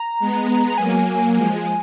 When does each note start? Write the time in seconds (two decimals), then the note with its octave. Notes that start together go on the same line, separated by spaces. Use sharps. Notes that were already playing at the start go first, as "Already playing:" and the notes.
Already playing: A#5
0.20 G#3 B3
0.69 A#5
0.77 F#3 A#3 G#5
1.35 F3 G#3